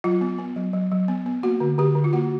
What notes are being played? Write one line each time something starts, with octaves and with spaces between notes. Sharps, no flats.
F#3 F4
B3
B3
F#3
F#3
F#3
B3
B3
A#3 F#4
D3
D3 G4
D3
F4
A#3 F#4